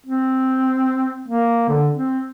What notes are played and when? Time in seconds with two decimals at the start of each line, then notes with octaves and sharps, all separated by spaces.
0.07 C4
1.28 A#3
1.68 D3
1.94 C4